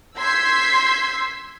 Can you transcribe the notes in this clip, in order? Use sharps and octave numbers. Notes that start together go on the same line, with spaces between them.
C6 E6 G6 G#6 B6 C7